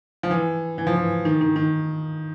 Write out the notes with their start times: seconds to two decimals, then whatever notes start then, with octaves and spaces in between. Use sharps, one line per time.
0.23 F3
0.31 E3
0.78 E3
0.87 F3
0.95 E3
1.25 D#3
1.41 D#3
1.56 D#3